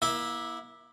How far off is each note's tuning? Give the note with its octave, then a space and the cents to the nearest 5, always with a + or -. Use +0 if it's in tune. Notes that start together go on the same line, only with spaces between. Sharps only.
A#3 +35 E4 -5 E5 -10